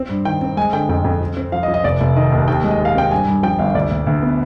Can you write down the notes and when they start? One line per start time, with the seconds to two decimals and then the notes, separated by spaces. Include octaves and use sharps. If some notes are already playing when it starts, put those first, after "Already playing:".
Already playing: C4
0.09 G2
0.25 D#3 G5
0.41 C4
0.57 G#3 G#5
0.73 D3 G5
0.89 F2 G5
1.04 F2
1.20 F3
1.37 C4
1.52 F3 F5
1.63 D#5
1.68 F3
1.74 D#5
1.84 F1 D5
2.01 F1
2.16 D#3 D#5
2.32 D#2
2.48 D#2 G5
2.64 G#3
2.71 D#5
2.80 D#2
2.85 F5
2.95 C4 G5
3.11 G2 G#5
3.27 G2
3.43 F3 G5
3.59 G1 F5
3.74 D2 D5
3.91 D2
4.07 D2
4.23 B3